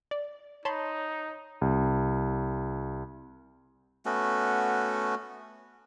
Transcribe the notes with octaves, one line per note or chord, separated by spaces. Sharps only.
D5
D#4 C#5 A5 B5 C6
C2
A3 B3 C#4 F#4